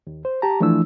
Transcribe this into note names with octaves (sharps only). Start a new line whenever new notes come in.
D#2
C5
G4 A5 A#5
E3 F3 A3 D4 E4 E6